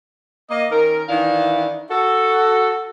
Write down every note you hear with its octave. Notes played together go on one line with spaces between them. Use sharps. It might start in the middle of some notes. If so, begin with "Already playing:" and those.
A#3 D#5
D#3 C#4 A#4
D#3 E3 D4 E4 F5
F#4 A4